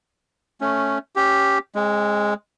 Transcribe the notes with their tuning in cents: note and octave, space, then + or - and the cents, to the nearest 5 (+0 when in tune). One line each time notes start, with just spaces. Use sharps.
A3 +0 C#4 +0
C#4 +0 G4 +0
G#3 +0 C4 +40